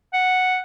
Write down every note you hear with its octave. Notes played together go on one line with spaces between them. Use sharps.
F#5